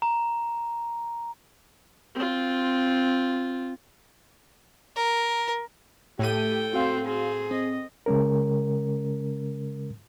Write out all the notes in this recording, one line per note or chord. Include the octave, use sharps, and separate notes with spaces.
A#5
C4 F4
A#4
A2 A3 G4 A4 G5 D#7
C4 F#4 C5 F5
C4 G#4
C4 D#5
C#3 G#3 C#4 A#4